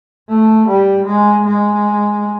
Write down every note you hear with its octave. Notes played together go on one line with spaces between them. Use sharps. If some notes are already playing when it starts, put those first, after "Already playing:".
A3
G3
G#3
G#3